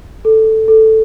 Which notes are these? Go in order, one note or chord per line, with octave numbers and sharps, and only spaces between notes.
A4
A4